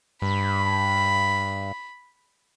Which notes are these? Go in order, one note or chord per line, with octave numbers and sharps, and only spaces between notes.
G2 B5